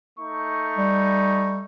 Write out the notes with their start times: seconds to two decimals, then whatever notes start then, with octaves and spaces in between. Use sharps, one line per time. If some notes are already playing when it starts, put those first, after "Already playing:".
0.18 A3 D#4 C#6
0.78 G3